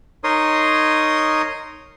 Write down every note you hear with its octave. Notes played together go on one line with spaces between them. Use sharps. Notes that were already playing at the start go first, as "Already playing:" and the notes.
D#4 A#4 C#5 C6 D#6